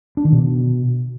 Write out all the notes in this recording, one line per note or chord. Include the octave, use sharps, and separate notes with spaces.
D4
D#3
B2